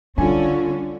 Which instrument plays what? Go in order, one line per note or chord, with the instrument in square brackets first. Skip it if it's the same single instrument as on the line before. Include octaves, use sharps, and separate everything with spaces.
[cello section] D3 C#4 [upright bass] G3 [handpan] D4 [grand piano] F4 G#5